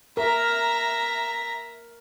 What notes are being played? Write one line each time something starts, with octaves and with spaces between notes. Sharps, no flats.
A#4 E5 A#5